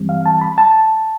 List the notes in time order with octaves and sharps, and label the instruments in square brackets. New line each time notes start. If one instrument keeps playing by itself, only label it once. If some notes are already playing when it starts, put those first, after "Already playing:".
Already playing: [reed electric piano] G2 E3 G3 C4
F5
A5
B5
A5